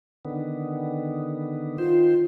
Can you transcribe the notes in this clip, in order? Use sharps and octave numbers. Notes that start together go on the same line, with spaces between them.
D3 D#3 B3
D#3 F4 C5